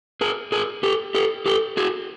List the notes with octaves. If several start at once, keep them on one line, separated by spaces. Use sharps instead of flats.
G#4 A#4
G#4 A#4
G4 A4
G4 A4
G4 A4
F#4 G#4